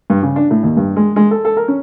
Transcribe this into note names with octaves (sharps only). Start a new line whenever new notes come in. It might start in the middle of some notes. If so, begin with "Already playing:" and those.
G2
C#3
D4
A2
D#2
G2
G#3
G#3
A4
A4
A#4
C#4